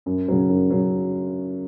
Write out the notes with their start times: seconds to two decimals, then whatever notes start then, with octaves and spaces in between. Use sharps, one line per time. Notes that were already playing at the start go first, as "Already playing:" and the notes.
0.06 F#2
0.28 C#3 F#3
0.49 F#2
0.70 C#3 F#3